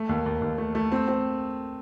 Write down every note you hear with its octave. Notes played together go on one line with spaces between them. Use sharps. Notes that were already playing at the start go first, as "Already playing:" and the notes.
Already playing: A3
D#2
D#2
D#2
A3
A3
C4
C4